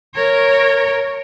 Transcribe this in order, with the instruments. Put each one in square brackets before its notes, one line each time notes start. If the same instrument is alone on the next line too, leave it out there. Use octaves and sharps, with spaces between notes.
[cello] A#4 C#5